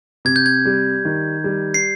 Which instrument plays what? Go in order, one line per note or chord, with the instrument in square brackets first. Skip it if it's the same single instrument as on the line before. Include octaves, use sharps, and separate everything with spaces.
[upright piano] C3 [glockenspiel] G#6
[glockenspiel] G6
G#6
[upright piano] G3
D#3
G3
[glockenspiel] C7